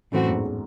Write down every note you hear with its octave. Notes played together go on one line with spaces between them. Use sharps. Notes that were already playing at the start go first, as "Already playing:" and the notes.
F#2 A2 E3 A3 C4 F#4
E2 G#2